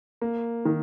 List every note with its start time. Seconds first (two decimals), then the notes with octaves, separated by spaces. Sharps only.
0.22 A#3
0.65 D#3